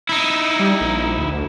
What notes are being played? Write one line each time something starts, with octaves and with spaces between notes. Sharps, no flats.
D#4 E4
G3
A#1
D2